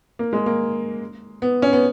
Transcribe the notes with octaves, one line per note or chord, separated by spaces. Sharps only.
A#3
G#3
A#3
B3
C#4
B3